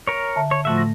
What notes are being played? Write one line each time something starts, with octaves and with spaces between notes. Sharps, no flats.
A#4 C#5
D3 E5 A5
C#5
A2 F3 A3 F#4 E5 A5
A#6